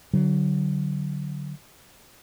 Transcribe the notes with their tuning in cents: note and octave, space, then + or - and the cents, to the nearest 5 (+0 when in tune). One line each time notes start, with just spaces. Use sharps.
D3 +0 F#3 +20